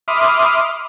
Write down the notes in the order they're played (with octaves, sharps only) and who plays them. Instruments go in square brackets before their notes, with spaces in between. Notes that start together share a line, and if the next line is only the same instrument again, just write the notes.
[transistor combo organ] E5 B5 C6 D6 D#6 F6